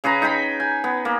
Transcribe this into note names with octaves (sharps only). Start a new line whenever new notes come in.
C#3 G#4 B4 A#5
D#4 G#4 G5 B5
G#5
B3
A#3